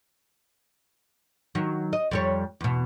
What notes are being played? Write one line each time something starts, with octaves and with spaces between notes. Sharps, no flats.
D#3 F#3
D#5
F2 G3 C#5
E2 B2